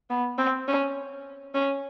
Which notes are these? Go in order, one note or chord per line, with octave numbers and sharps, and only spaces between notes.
B3
C4
C#4
C#4